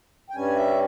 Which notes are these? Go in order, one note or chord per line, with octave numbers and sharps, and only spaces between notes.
G5
G2 G3 C#4 G#5
E5